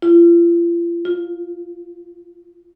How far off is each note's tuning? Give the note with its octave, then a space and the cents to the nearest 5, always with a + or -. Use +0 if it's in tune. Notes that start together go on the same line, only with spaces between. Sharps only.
F4 -40
F4 +10